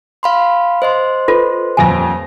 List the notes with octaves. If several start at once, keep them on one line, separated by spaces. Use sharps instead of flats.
F5 B5 C6
C5 D#5 C6
F4 A4 B4
D#1 F2 G#5 A#6